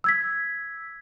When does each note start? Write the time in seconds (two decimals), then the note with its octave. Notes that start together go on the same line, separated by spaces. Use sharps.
0.04 E6 G#6 B6